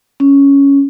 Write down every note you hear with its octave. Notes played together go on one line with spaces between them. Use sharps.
C#4